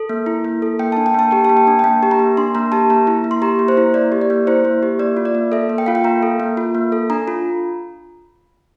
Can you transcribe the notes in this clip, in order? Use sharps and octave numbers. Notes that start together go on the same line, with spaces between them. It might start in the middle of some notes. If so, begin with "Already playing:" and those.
Already playing: A4
A#3
E4
A#3
A4
A#3 G5
D4 A5
G5
A#3 A5
G4 G5
A#3 A5
G5
D4
G5
A#3 A5
G4
A#5
A#3
D4 C6
A#3 A#5
G4 A5
A#3 A#5
E4
A#3
C6
G4 A#5
A#3
C5
E4
A#3 D5
G4
D5
A#3
E4 C5
A#3
G4
A#3 D5
F4
D5
A#3
A4 E5
A#3
G5
F4 F5
G5
A#3 A#5
A4
A#3
F4
A#3
A4
D4 A#5
F4